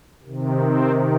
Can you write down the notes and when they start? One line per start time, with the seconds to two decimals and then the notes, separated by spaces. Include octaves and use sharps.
0.23 C3 D#3
0.59 C4